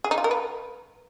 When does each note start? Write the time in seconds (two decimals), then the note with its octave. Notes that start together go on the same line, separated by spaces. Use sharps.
0.04 G#4
0.11 D#4
0.18 F4
0.24 A#4
0.31 B4